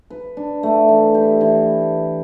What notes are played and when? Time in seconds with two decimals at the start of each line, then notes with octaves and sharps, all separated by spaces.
0.10 B4
0.37 D4
0.63 A3
0.89 E3
1.15 G4
1.41 E3